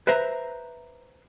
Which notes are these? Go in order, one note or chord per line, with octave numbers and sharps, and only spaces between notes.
B4 C5 E5 A#5